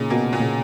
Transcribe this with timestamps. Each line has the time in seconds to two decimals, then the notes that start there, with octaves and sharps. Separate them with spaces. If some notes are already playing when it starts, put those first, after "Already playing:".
Already playing: A#2 C#3 D#4
0.10 B2 A#3
0.33 A#2
0.40 C#3